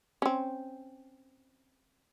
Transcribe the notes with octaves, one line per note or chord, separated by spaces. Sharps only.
C4 C#4